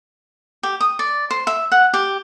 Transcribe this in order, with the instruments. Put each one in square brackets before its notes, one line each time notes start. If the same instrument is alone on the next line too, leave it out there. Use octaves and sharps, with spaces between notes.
[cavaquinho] G4
D#6
D5
C5
E5
F#5
G4